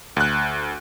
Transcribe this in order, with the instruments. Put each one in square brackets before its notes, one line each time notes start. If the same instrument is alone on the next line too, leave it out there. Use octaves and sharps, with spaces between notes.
[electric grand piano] D2 F#6